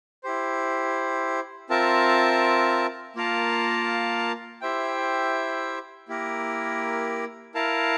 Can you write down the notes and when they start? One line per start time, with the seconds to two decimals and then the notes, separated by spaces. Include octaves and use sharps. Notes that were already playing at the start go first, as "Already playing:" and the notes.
0.23 E4 G4 C5
1.70 C4 F4 A#4 E5 A5
3.16 A#3 F4 A#4 F5 A5
4.61 E4 G4 C5 E5 G5
6.08 A#3 E4 G4 A#4
7.54 E4 A#4 F5 A5